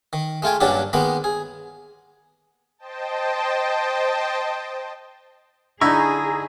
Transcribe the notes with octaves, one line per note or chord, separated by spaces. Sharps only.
D#3
G#3 A3 F4 G5 G#5
G2 A#2 F#3 C#4 D4 G4
D#3 G#3 A#3 B3
G#4
C5 D#5 G5 A5
D3 D#4 E4 G#4 D#5 A#5 C#6